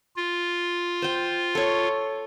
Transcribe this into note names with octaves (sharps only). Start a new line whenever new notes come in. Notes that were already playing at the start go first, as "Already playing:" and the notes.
F4
C5 G5
A4 C#5